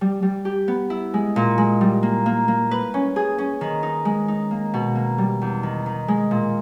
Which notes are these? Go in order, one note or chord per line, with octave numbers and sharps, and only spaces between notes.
G3
G3
G4
B3
E4
G#3
A#2
G#3
G3
A#3
A#3
A#3
B4
C#4
G#4
C#4
D#3
D#4
G#3
D#4
A#3
B2
A#3
G3
E2
D#3
D#3
G#3
A#2